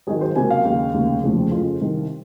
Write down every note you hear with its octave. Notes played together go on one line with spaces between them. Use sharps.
G#1 G#2 D#3 F#3 G#4
C5
C#2 C3 F#3 A#3 G#5
F5
D#2 C#3 G#3
F1 D#2 C#3
F1 D#2 C#3 F3 G#4
F2 C#3 G#3 F4
C2 C3 D#3